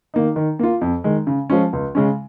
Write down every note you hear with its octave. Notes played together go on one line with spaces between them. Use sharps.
D#3 A#3 D#4
D#3
A#3 F4
F2
D#3 G#3
C#3
F3 G#3 C#4
C#2
C#3 G#3 C#4